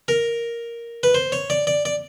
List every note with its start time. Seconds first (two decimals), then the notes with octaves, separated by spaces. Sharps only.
0.08 A#4
1.03 B4
1.15 C5
1.32 C#5
1.50 D5
1.67 D5
1.85 D5